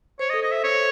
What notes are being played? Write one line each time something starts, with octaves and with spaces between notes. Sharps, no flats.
C5 C#5
D#5
A4
D#5
C5
E5
C#5